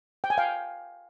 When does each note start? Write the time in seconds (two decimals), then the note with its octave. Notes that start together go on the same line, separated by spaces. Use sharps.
0.24 G5
0.30 G#5
0.38 F5 G5